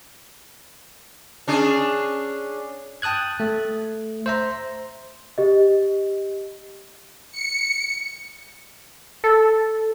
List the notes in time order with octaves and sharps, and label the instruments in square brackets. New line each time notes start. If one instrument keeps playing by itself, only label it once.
[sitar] C#4 D4 G#4
[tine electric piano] G5 A5 D#6 F#6 G#6
A3
C5 E5 A#5
[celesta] G4 D#5
[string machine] C#7
[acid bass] A4